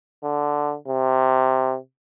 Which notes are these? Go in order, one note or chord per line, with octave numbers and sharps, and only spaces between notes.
D3
C3